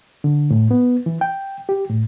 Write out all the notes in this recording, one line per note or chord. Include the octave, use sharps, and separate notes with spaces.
D3
A2
B3
E3
G5
G4
A2